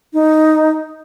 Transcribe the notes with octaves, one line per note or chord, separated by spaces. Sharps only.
D#4